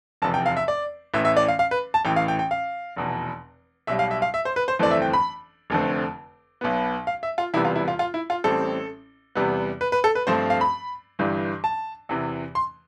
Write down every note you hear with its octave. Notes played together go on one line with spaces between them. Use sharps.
F1 E2 C3 F3 A5
G5
F5
E5
D5
A1 A2 E3 E5
E5
D5
F5
F5
B4
A5
A1 A2 E3 G5
F5
G5
G5
F5
F1 E2 B2
B1 B2 G3 E5
F5
E5
F5
E5
C5
B4
C5
G1 F2 E3 A3 C4 D5
E5
G5
B5
F1 F2 D3 A3 C4
B1 B2 B3
F5
E5
F4
E1 E2 C3 G3 B3 E4
F4
E4
F4
F4
E4
F4
A1 A2 G3 C4 A4
E2 C3 G3 B3
B4
B4
A4
B4
G2 F3 A3 C4 C5
F5
B5
G1 G2 E3 G3
A5
E2 C3 E3
C6